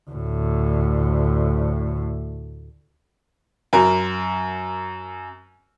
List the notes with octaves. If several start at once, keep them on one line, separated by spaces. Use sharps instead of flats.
D2 A2
F#2 A#4